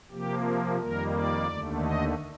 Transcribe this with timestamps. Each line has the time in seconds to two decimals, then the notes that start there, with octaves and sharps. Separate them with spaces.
0.11 C3 F3 A#3 G4
0.79 F2 D#3 G3 A#3 A#4
1.13 D5
1.47 D#2 D3 A3
1.81 D#5